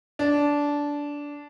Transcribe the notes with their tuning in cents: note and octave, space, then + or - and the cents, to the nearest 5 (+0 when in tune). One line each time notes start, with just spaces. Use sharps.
D4 -15